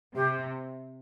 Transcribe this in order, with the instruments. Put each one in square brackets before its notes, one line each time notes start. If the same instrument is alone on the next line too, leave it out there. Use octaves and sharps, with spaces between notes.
[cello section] C3 [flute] G4